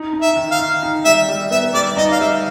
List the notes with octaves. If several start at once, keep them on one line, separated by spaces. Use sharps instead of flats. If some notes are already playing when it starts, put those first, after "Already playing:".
Already playing: D#4
D#4
E5
D#3
F5
D#3
D#4
G3 E5
G3
B3 E5
G3 D5
D#4 D#5
F5
G3 E5